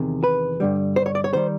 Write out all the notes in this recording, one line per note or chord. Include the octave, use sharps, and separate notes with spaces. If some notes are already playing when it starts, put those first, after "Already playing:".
Already playing: E2 C3 D#3
B4
G2 D3 G3
C5
C#5
D5
C#5
D#3 G3 C5